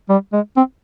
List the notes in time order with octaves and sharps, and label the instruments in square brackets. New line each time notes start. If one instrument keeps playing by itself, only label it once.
[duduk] G3
G#3
C4